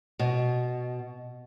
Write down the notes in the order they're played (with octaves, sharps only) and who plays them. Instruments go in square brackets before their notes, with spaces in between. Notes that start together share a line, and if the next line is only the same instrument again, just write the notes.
[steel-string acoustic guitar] B2